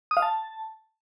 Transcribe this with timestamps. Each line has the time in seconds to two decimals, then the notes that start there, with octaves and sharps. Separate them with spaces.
0.11 D#6
0.17 F5
0.22 A5